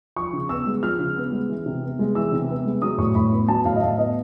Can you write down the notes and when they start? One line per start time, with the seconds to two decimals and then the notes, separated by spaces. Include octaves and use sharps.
0.16 F3 C#6
0.33 C#3
0.49 B3 E6
0.66 G#3
0.83 F3 F6
1.00 C#3
1.16 B3
1.32 G#3
1.49 E3
1.66 C3
1.82 B3
1.99 G#3
2.15 E3 E6
2.32 C3
2.48 B3
2.65 G#3
2.82 F#3 D#6
2.98 A2 C#6
3.15 A2 B5
3.32 B3
3.48 F#3 A5
3.65 A2 F5
3.76 D#5
3.81 A2 E5
3.98 B3 D#5